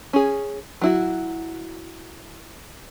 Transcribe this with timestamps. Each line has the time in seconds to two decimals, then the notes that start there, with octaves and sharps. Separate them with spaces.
0.13 C#4 G#4
0.81 F#3 E4 F#4